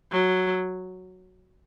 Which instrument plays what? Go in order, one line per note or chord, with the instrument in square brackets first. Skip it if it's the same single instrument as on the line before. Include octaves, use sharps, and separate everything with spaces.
[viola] F#3